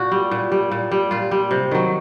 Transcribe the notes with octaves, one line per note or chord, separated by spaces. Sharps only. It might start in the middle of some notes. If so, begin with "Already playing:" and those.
Already playing: A#2 F#4
G3
A#2
G3
A#2
G3
A#2 F4
G3
C3
D#3 F#3